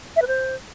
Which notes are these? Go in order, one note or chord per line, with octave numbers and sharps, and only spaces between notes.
E5
B4
C5